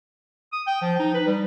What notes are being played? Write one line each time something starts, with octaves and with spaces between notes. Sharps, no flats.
D#6
G5
F3
D#4
B4
G3